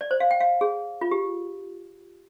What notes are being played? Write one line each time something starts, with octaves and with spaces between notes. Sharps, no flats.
D5
C5
F5
G5
F5
G#4
F4
G4